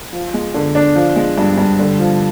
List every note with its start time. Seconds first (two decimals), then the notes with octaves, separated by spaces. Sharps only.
0.13 F3
0.34 G#3
0.54 D3
0.75 D4
0.96 F3
1.16 G#3
1.38 G2
1.58 G2
1.79 D3
1.99 F3